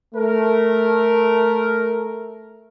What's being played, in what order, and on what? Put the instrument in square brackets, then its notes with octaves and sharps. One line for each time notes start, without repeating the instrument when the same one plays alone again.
[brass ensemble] A3 A#4